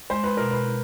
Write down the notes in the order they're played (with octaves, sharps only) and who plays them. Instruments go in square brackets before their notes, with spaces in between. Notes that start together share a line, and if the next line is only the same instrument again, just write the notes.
[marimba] G#3 [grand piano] C5
[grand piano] B4
[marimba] B2 [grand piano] A#4
[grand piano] B4